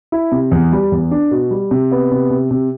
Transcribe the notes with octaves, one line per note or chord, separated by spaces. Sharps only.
E4
C3
E2
G3
E2
D4
B2
G3
C3
B3
C3
C3
C3